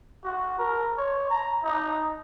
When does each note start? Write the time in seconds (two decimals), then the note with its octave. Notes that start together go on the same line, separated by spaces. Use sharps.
0.24 F#4
0.59 A#4
0.97 C#5
1.30 A#5
1.63 D#4